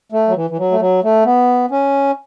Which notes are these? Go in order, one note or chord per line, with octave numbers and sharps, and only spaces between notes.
A3
F#3
E3
E3
F#3
A3
F#3
A3
B3
C#4